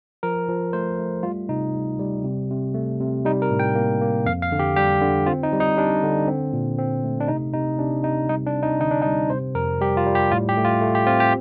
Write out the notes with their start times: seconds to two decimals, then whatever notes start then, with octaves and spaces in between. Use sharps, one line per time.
0.23 F3 A#4
0.49 F3
0.73 A3 C5
0.99 A3
1.23 G3 F4
1.49 C3 D#4
1.73 G3
1.99 G3
2.24 C3
2.50 C3
2.74 A3
3.00 C3
3.25 G3 D#4
3.42 A#4
3.50 A2
3.59 G5
3.75 A#3
4.02 A#3
4.26 F2 F5
4.42 F5
4.52 D3
4.59 G4
4.76 G3 G4
5.01 D3
5.26 C4 F4
5.43 D#4
5.52 G3
5.60 D#4
5.77 G3 D4
6.03 D3
6.27 C4
6.53 A#2
6.78 C4
7.04 A3
7.20 D4
7.28 C3 D#4
7.53 C3 D#4
7.79 C3 D4
8.04 C3 D#4
8.29 G3 D#4
8.46 D4
8.54 C4
8.63 D#4
8.80 D3 D#4
8.91 D4
9.02 D#4
9.06 G3
9.30 C3 C5
9.55 F2 A#4
9.81 G3 G4
9.97 F4
10.06 G3
10.15 G4
10.31 A2 F4
10.49 G4
10.57 A3
10.65 F4
10.81 A3
10.95 G4
11.06 C4 F4
11.20 G4